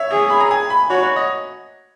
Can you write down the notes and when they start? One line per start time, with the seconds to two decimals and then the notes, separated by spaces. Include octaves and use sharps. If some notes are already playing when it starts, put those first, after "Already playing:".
Already playing: C#5 E5
0.11 G#4
0.30 B5
0.40 A#5
0.51 G#5
0.70 B5
0.90 F#4 C#5
1.03 C#5
1.16 D#5